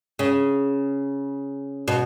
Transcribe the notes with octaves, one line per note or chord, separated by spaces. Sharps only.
C#3
B2